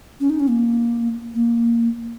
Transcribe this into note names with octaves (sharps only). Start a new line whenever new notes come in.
C#4
D#4
C#4
A#3
A#3